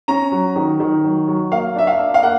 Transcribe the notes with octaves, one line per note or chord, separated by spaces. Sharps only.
C#4 A#5
F#3
D#3
D#3
F#3
F#3
A#3 F5
D4 E5
F5
D4
F5
A#3 F#5